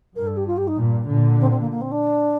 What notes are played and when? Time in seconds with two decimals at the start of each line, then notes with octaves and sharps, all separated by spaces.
0.15 G2 A#4
0.26 A4
0.36 G4
0.47 F4
0.57 G4
0.67 D#4
0.77 G2 A#2
1.08 A#2 D3
1.39 C4
1.50 C4
1.59 A#3
1.70 A#3
1.81 C4
1.91 D4